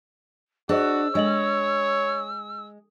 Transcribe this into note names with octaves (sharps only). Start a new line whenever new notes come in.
D4 F#4 G#4 C5 D#5 E6
G#3 D4 C#5 D#5 F#7